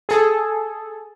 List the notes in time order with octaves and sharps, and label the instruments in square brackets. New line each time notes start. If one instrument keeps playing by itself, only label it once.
[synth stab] G#4 A4